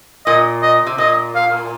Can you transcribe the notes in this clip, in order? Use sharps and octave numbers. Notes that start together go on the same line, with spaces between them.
A#2 D#5
D#5
C3
A#2 D#5
F5